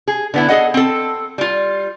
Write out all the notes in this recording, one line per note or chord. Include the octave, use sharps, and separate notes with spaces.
G#4
D3 B3 E4
G#4 A4 D#5 F#5
C4 A4
G3 F4